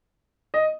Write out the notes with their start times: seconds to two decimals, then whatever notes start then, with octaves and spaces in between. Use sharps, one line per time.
0.54 D#5